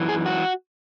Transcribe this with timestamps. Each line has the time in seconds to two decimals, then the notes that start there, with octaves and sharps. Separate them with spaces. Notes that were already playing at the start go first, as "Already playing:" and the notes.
Already playing: F#2 E3
0.09 G#4
0.26 F#4